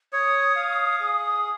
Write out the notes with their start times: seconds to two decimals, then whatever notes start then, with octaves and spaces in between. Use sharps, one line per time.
0.13 C#5 D#6
0.56 F5
1.00 G#4 D#6